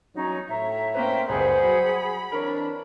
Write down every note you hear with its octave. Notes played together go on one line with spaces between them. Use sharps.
E2 G2 F#3 C#4 D#4 A#5
A2 C#5 E5 A#5
A#3 C#4 B4 C5 G5
F#1 C#2 G3 G#4 B4 C5 F#5
F#3 B5
E3 C4 D4 A#4 C#5